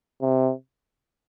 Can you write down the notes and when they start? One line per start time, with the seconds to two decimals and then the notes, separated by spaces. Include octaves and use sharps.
0.21 C3